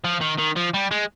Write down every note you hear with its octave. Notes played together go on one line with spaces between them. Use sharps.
F3
D#3
D#3
F3
G3
G#3